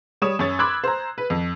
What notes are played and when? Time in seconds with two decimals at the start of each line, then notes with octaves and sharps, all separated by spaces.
0.22 G3 C#5 D#6 E7
0.39 F#2 C#5 A6
0.59 B5 C6 D6 E6 F#6 G#6
0.84 C5 A#5
1.18 B4
1.30 F2